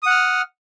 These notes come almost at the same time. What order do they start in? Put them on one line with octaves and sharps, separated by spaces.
D#6 F#5 F6